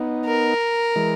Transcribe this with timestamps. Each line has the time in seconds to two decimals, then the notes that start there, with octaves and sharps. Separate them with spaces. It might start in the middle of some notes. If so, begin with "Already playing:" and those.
Already playing: B3 D#4
0.26 A#4
0.96 E3 G#3